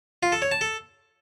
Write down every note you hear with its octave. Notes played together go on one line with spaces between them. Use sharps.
F4
A4
C#5
A5
A4